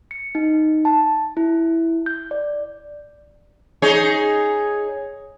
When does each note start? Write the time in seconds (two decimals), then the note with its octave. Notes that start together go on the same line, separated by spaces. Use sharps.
0.11 C#7
0.35 D#4
0.85 A5
1.37 E4
2.06 G6
2.31 D5
3.82 D#4 G#4 C#5